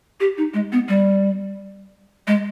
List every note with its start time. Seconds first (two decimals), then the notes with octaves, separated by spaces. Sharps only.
0.20 G4
0.38 D#4
0.54 G#3
0.72 B3
0.89 G3
2.27 G#3